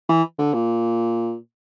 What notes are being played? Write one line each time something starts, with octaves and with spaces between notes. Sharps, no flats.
E3
D3
A#2